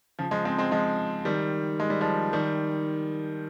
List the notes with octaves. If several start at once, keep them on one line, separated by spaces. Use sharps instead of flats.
C#3 F3
F3 G#3
G#3 C4
G#3 C4
F3 G#3
D#3 G3
G#3
G3
F3 G#3
D#3 G3